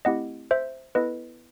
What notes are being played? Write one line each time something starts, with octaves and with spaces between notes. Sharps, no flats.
A3 C4 E4 G4 D#5 F#5
C5 E5
B3 E4 A4 B4 D#5